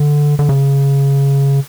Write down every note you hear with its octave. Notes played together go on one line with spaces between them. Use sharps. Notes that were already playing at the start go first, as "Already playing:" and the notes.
Already playing: D3
D3
C#3